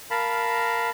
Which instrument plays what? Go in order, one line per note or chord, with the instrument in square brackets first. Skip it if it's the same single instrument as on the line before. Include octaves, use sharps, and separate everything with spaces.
[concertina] A#4 F5 A5 B5